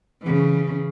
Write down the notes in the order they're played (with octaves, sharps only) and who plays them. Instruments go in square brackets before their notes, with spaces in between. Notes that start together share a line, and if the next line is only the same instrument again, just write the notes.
[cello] C#3 E3